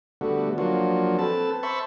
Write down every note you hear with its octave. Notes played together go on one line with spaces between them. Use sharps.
D3 G3 A3 B3 F#4
F3 F#3 A#3 D4 F4 F#4
C4 A4 B4 A5
C5 E5 A5 B5 C#6